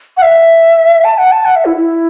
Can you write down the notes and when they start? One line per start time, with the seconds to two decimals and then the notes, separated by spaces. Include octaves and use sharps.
0.17 F#5
0.22 E5
1.04 A5
1.18 F#5
1.32 A5
1.45 F#5
1.56 E5
1.65 E4
1.77 E4